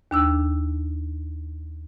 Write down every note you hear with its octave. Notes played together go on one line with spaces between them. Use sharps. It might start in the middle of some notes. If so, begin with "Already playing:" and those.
D#2 D4 E6